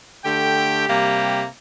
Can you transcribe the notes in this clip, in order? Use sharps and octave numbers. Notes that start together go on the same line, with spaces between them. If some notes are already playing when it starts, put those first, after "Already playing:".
D3 A3 G4 G5
C3 G3 A#3 G4